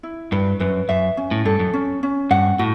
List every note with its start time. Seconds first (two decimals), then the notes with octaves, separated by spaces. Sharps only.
0.03 E4
0.32 G2 B4
0.60 F#2 B4
0.89 F#2 E5
1.17 C#4
1.31 A2
1.45 G2 A4
1.60 F#2
1.74 C#4
2.03 C#4
2.31 G2 F#5
2.59 A2 F#4